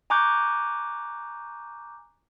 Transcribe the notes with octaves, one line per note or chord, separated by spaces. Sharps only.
G#5 A#5 C#6 D6 F#6 G6